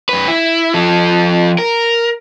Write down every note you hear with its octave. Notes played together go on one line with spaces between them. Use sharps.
F#2 B4
E4
F3 A4
A#4